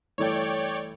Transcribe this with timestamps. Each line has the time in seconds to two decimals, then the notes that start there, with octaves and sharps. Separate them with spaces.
0.18 G1 E3 A3 C#5 D5 G5